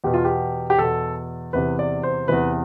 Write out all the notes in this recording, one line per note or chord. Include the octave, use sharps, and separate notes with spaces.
E2 B2 G4
F4
G4
G4
E2 B2 A4
E2 C3 E3 B4
D5
C5
E2 C3 E3 B4